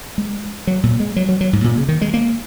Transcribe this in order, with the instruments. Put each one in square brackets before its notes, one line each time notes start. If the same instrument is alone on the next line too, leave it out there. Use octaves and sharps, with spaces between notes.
[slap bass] G#3
F#3
A#2
G#3
F#3
F#3
F#3
G#2
A#2
C#3
D#3
G#3
A#3